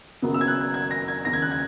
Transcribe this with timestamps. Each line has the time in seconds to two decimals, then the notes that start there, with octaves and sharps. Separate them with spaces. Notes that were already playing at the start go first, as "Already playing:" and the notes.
0.22 F#1 F#2 C#3 F#3 B3
0.34 E6
0.41 G#6
0.48 F#6
0.61 G#6
0.74 G#6
0.91 A#6
1.08 G#6
1.25 E1 D#2 C#3 A#6
1.33 G#6
1.42 F#6
1.51 G#6